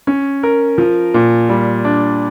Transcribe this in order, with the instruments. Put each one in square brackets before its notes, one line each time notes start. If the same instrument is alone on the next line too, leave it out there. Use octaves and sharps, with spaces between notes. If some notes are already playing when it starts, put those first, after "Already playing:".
[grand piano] C#4
A#4
F3
A#2
G3
D4